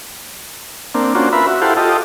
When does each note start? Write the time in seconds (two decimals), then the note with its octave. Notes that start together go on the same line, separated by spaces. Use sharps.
0.95 A#3 C4 D4
1.15 A#3 C#4 D4 F4 F#4 C5
1.33 F4 A#4 B4 E5 B5
1.47 F#4 E5
1.62 E4 G4 A4 C5 F5 F#5
1.77 F4 G4 A4 D#5